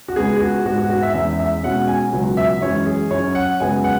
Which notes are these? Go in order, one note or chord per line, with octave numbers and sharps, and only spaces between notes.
F#4
C#2 C#3 G#3 B3 G#4
G#4
F#4
G#2 G#3 B3 F#4
F#4
F#4
F#5
E5
E2 E3 G#3 C#4 E5
E5
B2 G#3 C#4 F#5
G#5
C#2 B2 F#3 B3
E5
F#2 E3 G#3 C#4 C#5
G#4
F#2 F#3 C#4 C#5
F#5
F#2 C#3 G#3 B3 G#5
F#5